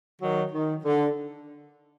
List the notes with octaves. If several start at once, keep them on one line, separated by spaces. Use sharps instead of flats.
D#3 F#3
D#3
D3